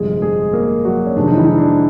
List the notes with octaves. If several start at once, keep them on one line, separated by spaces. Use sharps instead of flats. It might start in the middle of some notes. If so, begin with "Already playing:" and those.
Already playing: G1 F2 C3 G#3 G#4
G#3 G#4
A#3 A#4
F#3 F#4
C#4
F1 F2 C3 D#3 G#3 D4
D#4
E3 E4
D4